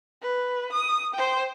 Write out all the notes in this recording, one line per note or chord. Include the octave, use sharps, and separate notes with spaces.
B4
D#6
C5 G5